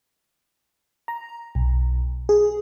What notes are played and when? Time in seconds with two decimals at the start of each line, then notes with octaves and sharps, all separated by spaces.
1.08 A#5
1.55 B1
2.29 G#4